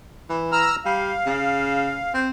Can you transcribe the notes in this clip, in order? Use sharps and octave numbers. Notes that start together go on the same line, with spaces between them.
E3
A#5 E6 F6
G3 F5
C#3
C4